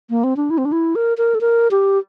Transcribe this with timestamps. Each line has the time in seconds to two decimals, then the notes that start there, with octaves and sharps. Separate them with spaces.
0.10 A#3
0.24 C4
0.37 D4
0.50 E4
0.58 C4
0.65 D4
0.72 E4
0.95 A#4
1.18 A#4
1.35 A4
1.41 A#4
1.71 G4